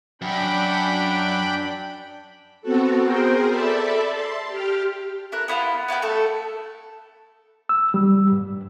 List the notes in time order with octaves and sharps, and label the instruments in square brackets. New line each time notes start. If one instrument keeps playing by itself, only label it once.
[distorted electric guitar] F#2 [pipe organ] D4 G5 B5
[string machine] B3 C4 F#4 A4
G#4 A#4 C5 G5
A4 D5 E5 A5 B5
A5 C6
G4 F6
[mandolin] E4 A4 A#4 F#6
B3 E4 F4 F5
B3 E4 F#4 G5
A3 A4
[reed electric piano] E6
G3
G2